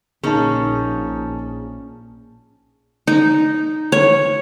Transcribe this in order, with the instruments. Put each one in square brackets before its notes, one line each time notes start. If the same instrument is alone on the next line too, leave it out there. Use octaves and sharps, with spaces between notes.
[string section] A#1 [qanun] A#3 C#4 [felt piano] D#4 [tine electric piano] G#4 A5
[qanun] D#4
C#5